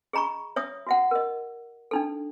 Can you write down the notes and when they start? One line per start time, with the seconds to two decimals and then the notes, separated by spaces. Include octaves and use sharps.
0.13 G#4 D#5 A#5 B5 C#6
0.56 C#5 E5 D#6
0.87 F#4 E5 F#5
1.11 A#4 D#5
1.91 D4 D#4 A4